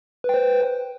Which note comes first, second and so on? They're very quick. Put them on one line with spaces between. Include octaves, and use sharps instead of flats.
B4 G5 C5